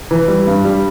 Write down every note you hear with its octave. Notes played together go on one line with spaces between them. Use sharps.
E3
G3
G2
G3